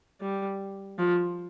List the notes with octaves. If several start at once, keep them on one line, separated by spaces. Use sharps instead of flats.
G3
F3